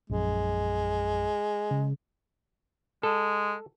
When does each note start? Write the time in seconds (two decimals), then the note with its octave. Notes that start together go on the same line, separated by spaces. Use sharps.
0.10 A#1 F#2 G#3
1.71 C#3
3.03 G#3 A4